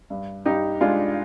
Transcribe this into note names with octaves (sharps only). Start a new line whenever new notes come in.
G2
G2 D#4 G4
G#3 D4 F4